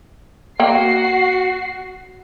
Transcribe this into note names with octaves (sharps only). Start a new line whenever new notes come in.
A#3 F#4 G5 C7